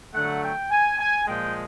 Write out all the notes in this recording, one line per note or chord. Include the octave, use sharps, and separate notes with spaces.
D3 F#3 A3 F#5
G5
G#5
G#5
A#2 F3 G#3 G5